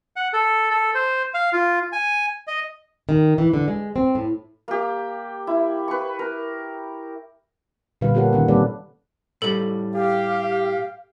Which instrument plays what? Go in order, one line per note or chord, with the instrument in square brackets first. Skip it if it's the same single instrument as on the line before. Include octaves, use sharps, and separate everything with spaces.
[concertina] F#5
A4
A4
C5
F5
F4
G#5
D#5
[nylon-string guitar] D#3
E3
D3
G#3
C4
A2
[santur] A#3 G4
E4
B4 C#6
A#4
[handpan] A#2 D3 G3 B4 F5
F4 G4 A4 A#4 C#5 F#5
D#3 C#4 F#5
G3 A#3 C4 A4 B4 D5
[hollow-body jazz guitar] A2 G3 [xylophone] A4
[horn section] G4 [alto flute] F5